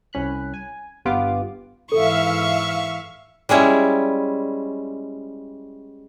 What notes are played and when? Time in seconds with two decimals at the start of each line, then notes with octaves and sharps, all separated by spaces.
0.13 C2 C#4 B5 F#6
0.54 G#5
1.05 G1 G2 B3 F4 G4 D6
1.92 G#2 E3 A4 E5 F5 C#6
3.49 G3 G#3 C#4 E4